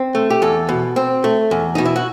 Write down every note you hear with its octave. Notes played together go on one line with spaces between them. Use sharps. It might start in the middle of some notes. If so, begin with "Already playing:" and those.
Already playing: C4
A3
G4
E2 A4
B2
C4
A3
E2
B2 D#4
E4
F#4